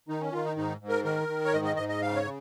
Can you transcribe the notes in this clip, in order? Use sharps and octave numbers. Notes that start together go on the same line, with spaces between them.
D#3 D#4
C#4
D#3 F4
D#4
G#2 D#4
G#2
A#4
D#3 A#4
D#3
C#5
G#2 D#5
D#5
G#2 D#5
D#5
C#3 F5
C#5
C#3